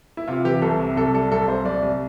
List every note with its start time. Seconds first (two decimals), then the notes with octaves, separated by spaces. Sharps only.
0.17 E4
0.28 C3 F4
0.44 E3 G4
0.62 C2 A4
0.79 C3
0.96 C2 A4
1.14 G3 A4
1.32 C2 A4
1.48 C2 C5
1.65 C2 D5
1.83 C2